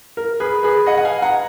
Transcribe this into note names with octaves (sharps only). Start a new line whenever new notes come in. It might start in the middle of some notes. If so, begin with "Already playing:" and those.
A#4
G#4 B4
G#4 B4
D#5 F#5
F#5
F5 G#5
F#5 A#5